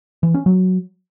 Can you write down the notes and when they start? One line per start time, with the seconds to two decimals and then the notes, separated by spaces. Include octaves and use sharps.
0.23 E3
0.34 C#4
0.46 F#3